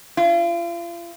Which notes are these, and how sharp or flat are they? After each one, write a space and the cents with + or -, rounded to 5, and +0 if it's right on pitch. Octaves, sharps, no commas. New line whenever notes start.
F4 -40